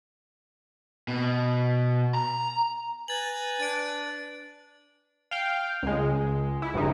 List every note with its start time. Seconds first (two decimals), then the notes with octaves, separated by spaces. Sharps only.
1.08 B2
2.14 A#5
3.08 B4 G#5 A#5 A6 F#7
3.60 D4 A6 D7
5.31 F5 G5
5.83 C#2 G#3
6.62 E4
6.74 G1 G2 C#3 D#4